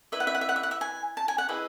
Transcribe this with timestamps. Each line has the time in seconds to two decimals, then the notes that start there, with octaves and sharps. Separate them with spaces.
0.12 E4 B4 D#5 E5
0.20 F#5
0.27 E5
0.35 F#5
0.41 E5
0.49 F#5
0.56 E5
0.63 F#5
0.71 E5
0.81 G#5
1.17 A5
1.28 G#5
1.38 F#5
1.49 E4 G#4 B4 D#5 E5